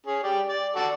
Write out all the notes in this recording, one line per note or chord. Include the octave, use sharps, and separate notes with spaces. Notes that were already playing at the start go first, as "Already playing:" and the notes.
C#4 G#4
G4 D5 G5
D5
F#4 A4 D5